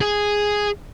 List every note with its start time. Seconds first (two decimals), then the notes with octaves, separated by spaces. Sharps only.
0.01 G#4